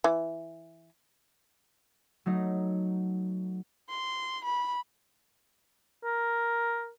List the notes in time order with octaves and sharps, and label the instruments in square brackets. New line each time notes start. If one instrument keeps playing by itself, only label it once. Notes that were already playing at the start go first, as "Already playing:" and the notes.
[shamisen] E3
[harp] F#3 A3 D#4
[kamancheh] C6
B5
[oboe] A#4